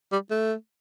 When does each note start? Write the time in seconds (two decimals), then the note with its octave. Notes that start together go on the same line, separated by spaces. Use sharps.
0.12 G3
0.30 A3